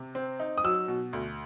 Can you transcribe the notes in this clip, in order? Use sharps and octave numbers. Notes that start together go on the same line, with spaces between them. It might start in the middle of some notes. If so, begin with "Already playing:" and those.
Already playing: C3
C4
D#4
D#6
F#3 E6
B2
D2